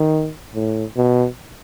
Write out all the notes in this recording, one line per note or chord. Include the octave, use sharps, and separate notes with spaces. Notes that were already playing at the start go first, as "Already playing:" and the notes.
Already playing: D#3
A2
B2